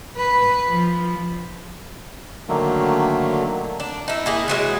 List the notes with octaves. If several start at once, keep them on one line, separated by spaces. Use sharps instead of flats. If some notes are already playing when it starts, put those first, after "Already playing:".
B4
F3
D3 D#3 F#3 A3 A#3
D4
D#4 E4
A#3 E4 G#4
E3 F#3 G#3